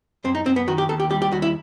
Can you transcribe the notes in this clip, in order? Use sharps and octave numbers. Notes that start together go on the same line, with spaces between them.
F#2 C4
D#4
F#2 C4
B3
D#3 F#4
G4
D#2 A4
G4
G3 G4
G4
D#2 F#4
E4